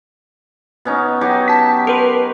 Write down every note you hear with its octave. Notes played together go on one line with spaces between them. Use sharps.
B2 C#4 D#4
F#3 D#4 G4
A5 B6
A#4 B4 C6